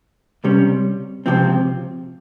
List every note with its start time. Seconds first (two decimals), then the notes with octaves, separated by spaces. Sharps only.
0.44 C#2 C3 G3 C#4
1.26 C#2 C3 F3 C4